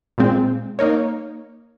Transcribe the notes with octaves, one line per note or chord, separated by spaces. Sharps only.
A#2 G#3 C4
A#3 D#4 A#4 C#5